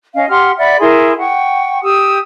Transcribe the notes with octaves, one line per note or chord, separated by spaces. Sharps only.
C#4 D#5 F5
G4 F#5 C6 F6
D5 E5 F#5 B5
E4 G#4 A#4 C6
F#5 G5 C#6
G4 D#6 E6